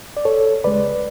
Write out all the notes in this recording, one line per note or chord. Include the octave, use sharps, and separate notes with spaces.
D5
A4 C#5
C#2 C#3 G#3 B4 D5